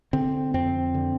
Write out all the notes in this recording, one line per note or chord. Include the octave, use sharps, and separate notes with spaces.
D3 C4
F2 C4
D3